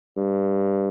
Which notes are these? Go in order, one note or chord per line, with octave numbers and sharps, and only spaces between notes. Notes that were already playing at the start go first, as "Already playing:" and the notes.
G2